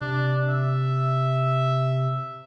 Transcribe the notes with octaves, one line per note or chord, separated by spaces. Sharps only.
C3 D4
E5